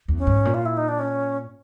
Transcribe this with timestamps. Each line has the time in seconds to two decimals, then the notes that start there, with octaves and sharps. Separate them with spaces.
0.08 E2
0.18 C#4
0.27 G#2
0.45 A#2
0.54 F4
0.66 E4
0.77 D#4
0.88 D4
0.99 C#4